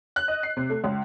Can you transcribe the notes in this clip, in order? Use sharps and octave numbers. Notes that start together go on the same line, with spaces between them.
F#6
D#5
C7
C3
A3
C#2